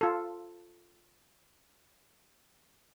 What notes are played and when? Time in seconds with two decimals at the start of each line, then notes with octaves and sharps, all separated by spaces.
0.01 F4 A4